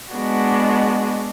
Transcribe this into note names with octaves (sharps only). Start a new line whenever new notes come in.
G#3 B3 D4 F#4